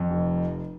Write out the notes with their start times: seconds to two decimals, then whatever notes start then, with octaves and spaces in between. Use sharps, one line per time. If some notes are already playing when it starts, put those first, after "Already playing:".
Already playing: F2
0.10 F1